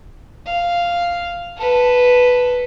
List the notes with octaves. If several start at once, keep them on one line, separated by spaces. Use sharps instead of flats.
F5
A4 B4